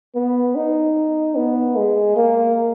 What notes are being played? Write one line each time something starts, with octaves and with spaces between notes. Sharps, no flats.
B3
D#4
B3
G#3
A#3